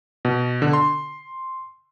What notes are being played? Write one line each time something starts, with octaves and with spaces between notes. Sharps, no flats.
B2
D3
C6